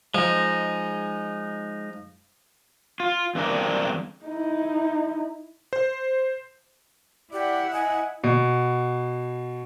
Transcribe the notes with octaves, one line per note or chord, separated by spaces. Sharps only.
F3 G#3 D#4
F4
E2 G2 C4 D4 A#4
D#4 E4
C5
E4 G4 D5 F#5
D#5 G#5
B2